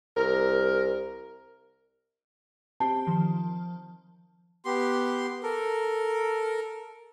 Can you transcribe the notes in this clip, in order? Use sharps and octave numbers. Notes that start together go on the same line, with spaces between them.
C2 A#4
C4 G4 A5
D#3 F3
B3 G4 C6
A4 A#4